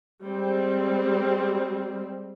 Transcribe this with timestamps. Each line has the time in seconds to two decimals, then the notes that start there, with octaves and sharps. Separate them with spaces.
0.23 G3 G#3 C4